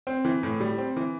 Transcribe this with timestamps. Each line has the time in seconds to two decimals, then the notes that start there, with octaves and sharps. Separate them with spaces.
0.07 C4
0.25 E3
0.43 A2
0.60 G3
0.78 C4
0.96 E3